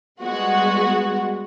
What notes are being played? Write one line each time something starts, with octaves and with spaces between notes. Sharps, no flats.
G3 G#3 B3 F#4